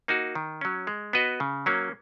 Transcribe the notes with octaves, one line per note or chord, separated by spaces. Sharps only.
A#3 D#4 F#4
D#3
F#3 C#4
G#3
B3 F#4 B4 D#5
C#3
F#3 A#3 C#4